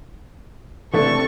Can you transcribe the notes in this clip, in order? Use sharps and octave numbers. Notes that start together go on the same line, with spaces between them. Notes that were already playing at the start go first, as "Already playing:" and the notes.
C3 E3 A3 C4 D4 A4 C#6